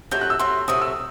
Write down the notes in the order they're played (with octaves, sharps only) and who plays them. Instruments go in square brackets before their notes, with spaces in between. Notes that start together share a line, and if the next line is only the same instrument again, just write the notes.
[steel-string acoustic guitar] C3 F#3 A3 [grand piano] G6
[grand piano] F#6
E6
[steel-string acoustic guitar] C3 F#3 A3 [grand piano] C6
[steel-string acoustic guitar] C3 F#3 A3 [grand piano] D#6
[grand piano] E6